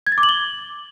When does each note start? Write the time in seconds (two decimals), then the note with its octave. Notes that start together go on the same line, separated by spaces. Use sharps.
0.07 G#6
0.12 A6
0.18 D6
0.23 F#7
0.29 G7